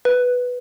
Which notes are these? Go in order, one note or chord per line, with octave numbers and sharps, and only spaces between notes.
B4